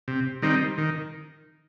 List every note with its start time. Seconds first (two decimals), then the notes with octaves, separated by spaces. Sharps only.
0.08 C3
0.42 D#3 G3 C4 D#4
0.78 D#3